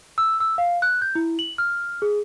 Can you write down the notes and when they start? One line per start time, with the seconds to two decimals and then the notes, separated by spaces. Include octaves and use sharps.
0.18 E6
0.40 E6
0.58 F5
0.82 F#6
1.02 G6
1.15 E4
1.39 F#7
1.58 F6
2.02 G#4